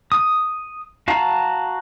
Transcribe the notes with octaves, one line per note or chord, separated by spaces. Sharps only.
D#6
F#4 F5 A5 A#5